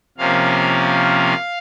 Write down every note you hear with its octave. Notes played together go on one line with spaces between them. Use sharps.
C3 F3 A#3 C#4 F5